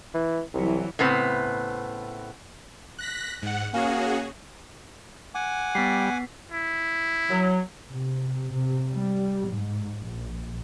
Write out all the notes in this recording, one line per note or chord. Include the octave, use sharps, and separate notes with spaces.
E3
C2 E3 F#3
A2 C#3 B3 C4
F#6 A#6 B6
G#2 F#5
A#3 C#4 F#4 G#4
F#5 G#5 D6
G3 B3 B6 C7
E4
F#3
C3
C3
G3
G#2
A#1